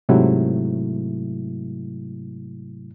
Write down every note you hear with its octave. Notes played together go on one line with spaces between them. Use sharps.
G#2 C3 F#3 A3 E4